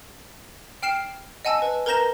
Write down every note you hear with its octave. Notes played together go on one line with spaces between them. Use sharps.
G5 F6 C7 E7
D#5 F#5 G#5 A5 E6
B4
A#4 B4 A#5 G6 A#6 E7